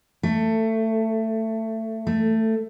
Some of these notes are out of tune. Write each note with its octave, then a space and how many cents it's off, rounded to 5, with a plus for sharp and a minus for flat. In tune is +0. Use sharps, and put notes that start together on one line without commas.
A3 +20
A3 +15